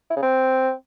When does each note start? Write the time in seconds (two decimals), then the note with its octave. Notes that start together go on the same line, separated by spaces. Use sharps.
0.10 E4
0.16 C#3
0.22 C4